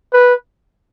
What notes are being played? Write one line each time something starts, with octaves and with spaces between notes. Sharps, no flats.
B4